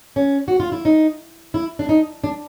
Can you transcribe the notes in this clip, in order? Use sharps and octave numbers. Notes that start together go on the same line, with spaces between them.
C#4
F#4
F4
E4
D#4
E4
D4
D#4
D4